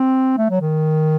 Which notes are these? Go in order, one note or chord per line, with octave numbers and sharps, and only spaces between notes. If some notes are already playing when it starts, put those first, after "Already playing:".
Already playing: C4
A3
F#3
D#3